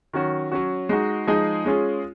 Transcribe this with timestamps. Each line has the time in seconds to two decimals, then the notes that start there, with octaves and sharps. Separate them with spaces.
0.14 D#3 F#3 C#4 F#4
0.52 F#3 C#4 F#4
0.89 G#3 D#4 F#4
1.27 F3 G#3 D#4 G#4
1.65 G#3 C#4 F4 G#4